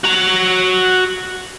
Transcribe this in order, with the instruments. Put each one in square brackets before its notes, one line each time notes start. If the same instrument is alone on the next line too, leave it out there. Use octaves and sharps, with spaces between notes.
[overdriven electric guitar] F#4 A#5